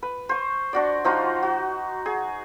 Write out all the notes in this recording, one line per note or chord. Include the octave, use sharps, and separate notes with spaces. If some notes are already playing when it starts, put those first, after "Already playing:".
B4
C5 C#6
D4 F#4 D5
F3 D#4 F4 F#4
F#4
G#4